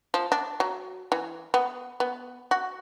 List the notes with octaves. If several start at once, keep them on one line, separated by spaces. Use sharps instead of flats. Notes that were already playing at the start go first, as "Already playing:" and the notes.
F3
D4
F#3
E3
B3
B3
F#4